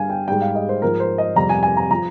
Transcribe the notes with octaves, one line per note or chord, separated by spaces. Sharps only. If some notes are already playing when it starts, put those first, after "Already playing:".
Already playing: G2 G3 F5 G#5
G5
G#2 G3 G5
F5
D#5
C5
G#2 F3 A#4
C5
D#5
F2 C3 G3 A#5
G#5
G#5
A#5
F3 A#5